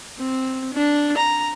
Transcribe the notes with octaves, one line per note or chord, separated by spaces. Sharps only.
C4
D4
A#5